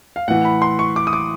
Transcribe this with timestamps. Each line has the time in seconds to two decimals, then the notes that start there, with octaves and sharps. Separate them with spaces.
0.16 F5
0.28 A2 E3 F#5
0.45 B5
0.62 C6
0.79 C#6
0.96 D6
1.07 D#6
1.13 D6